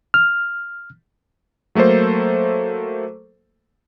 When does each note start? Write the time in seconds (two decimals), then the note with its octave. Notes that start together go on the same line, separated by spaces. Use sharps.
0.14 F6
1.75 F#3 A3 A#3 A4 C5